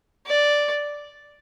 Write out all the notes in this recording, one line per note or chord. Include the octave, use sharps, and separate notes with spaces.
D5